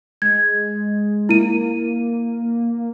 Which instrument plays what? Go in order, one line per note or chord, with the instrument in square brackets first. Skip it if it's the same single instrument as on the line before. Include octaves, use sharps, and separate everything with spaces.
[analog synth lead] G#3 [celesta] G#6
[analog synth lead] A#3 [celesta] E4 D#7